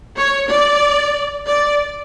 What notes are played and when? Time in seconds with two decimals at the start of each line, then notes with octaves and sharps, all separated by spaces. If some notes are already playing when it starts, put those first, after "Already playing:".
0.18 C#5
0.50 D5
1.48 D5